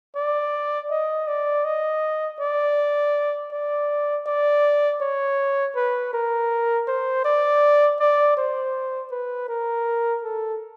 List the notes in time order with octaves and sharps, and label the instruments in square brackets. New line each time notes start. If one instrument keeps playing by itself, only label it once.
[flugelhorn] D5
D#5
D5
D#5
D5
D5
D5
C#5
B4
A#4
C5
D5
D5
C5
B4
A#4
A4